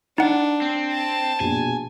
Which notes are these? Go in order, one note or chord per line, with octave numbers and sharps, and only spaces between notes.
D4 D#4 F#5
C4
A5
A#1 B2 G#5